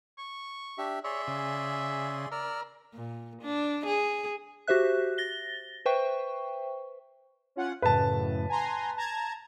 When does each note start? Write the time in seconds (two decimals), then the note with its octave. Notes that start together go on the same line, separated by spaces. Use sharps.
0.18 C#6
0.78 D4 G4 E5
1.04 G#4 C#5 D5 E5 C6
1.27 C#3
2.32 A#4 D5 E6 F6
2.94 A#2
3.42 D4
3.86 G#4
4.67 F#4 G4 C5 E5 F#6
5.18 A6 A#6 G7
5.86 B4 C5 E5 G5 C#6
7.56 C#4 F4 F#5
7.82 F#2 A2 C#3 B4 A5
8.49 G#5 A#5 C6
8.97 A5 A#5 G#6